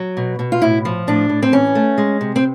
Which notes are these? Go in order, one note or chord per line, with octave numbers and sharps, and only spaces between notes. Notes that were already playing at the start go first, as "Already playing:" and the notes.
Already playing: F#3
B2
B2
F4
A2 E4
F3
A2 D4
A2
C4
E3 C#4
A3
G#3
C3
C4